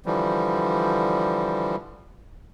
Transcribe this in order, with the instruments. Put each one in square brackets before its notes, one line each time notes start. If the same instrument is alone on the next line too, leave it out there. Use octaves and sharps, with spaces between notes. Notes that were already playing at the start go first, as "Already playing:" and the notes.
[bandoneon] D3 E3 F3 G3